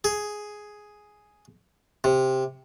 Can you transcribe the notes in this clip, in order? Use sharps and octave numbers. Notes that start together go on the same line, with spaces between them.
G#4
C3